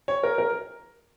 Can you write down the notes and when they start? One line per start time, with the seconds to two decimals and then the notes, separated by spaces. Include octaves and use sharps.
0.08 C#5
0.23 A#4
0.38 A#4